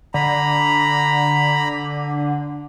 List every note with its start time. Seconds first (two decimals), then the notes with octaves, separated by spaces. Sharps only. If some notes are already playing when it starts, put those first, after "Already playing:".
0.14 D3 A#5 B5